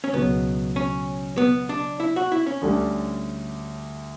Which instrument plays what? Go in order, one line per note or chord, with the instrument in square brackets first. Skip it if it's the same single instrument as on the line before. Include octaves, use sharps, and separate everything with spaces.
[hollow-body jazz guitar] C#4
[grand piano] C#2 B2 F#3 [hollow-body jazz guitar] B3
[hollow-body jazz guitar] C#4
B3
D4
E4
F#4
E4
C#4
[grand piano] D2 D3 G3 D4